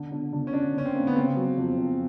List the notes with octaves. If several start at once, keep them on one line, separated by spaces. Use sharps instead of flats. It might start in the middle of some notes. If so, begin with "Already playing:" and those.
Already playing: D3
D3
D3
C#4
D3 D4
D3 C#4
C4
A#3
B3
C#3 C4
F#3
F2
F2